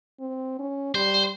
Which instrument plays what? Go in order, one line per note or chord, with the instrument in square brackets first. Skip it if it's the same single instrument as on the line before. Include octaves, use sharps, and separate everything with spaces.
[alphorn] C4
C#4
[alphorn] G3 [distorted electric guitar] C5